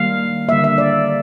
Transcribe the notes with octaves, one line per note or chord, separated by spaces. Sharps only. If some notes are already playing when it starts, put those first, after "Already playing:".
Already playing: D#3 G3 A#3 F5
D3 G3 A#3 E5
E5
D5